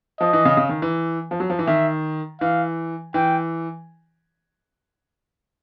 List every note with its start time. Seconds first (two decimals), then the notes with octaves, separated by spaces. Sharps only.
0.21 F3 D#5
0.33 E3
0.45 C#3
0.57 C#3
0.69 D#3
0.82 E3
1.31 F3
1.40 F#3
1.50 F3
1.59 E3
1.67 D#3 E5
2.41 E3 F5
3.14 E3 G5